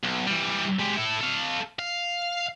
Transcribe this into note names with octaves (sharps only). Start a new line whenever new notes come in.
B1
E3 G3
G#3 G4
E4 A4
A4 F5
F5